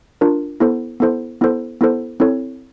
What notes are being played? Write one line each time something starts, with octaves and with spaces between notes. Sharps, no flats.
D4 F4 A#4
B3 E4 A4 C5
B3 E4 A4 C5
B3 E4 A4 C5
B3 E4 A4 C5
C4 E4 A4 C#5